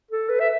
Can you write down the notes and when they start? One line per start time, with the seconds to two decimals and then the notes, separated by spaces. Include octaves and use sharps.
0.11 A4
0.29 B4
0.40 E5